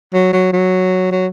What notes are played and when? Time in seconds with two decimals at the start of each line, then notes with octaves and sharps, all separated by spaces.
0.14 F#3
0.33 F#3
0.53 F#3
1.12 F#3